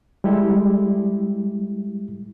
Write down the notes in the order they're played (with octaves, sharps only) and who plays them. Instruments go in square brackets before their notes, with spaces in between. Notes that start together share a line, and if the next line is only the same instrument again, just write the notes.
[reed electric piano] G3 G#3 E4 G4 A4